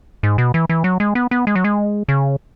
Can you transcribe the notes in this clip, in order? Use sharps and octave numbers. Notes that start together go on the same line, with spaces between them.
G#2
B2
E3
E3
F#3
G#3
B3
B3
G#3
F#3
G#3
C#3